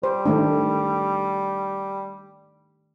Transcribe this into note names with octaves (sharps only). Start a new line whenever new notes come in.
G3 C5
D#3 A3 D4